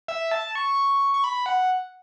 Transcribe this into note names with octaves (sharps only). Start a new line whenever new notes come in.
E5
A5
C#6
C#6
B5
F#5